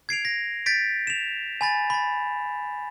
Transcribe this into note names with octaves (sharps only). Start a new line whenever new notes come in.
G#6 C7 D7 F7
A#6
G6 A6 B6 D7
E7 F7
G#5 B5 A6
B5 A6